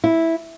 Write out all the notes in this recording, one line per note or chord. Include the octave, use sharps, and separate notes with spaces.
E4